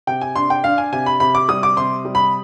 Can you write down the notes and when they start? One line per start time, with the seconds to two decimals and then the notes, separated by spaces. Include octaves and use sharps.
0.07 C3 G5
0.21 G#5
0.36 D4 C6
0.50 G5
0.64 D4 F5
0.78 G#5
0.92 C3 G#5
1.06 B5
1.20 C3 B5
1.35 D6
1.48 G3 D#6
1.63 D6
1.77 C3 C6
2.05 G3
2.15 B5